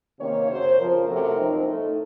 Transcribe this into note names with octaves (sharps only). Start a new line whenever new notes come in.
C3 D#3 A#3 C#4 C#5
F#2 C#3 F#3 C5
F2 C#3 F3 A#4
C3 F#3 A3
F#2 F3 C4 D#4
A2 A3 D#4 A4